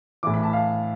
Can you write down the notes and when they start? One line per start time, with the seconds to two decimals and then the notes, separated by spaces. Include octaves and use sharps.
0.23 A2 E3 D6
0.34 B5
0.43 A5
0.53 F5